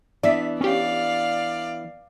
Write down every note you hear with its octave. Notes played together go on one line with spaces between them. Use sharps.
E3 B3 D4 D5 E5 B6
C#4 G4 D5 F5